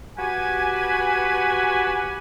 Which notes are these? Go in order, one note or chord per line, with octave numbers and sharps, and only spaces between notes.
F#4 G4 B4 G#5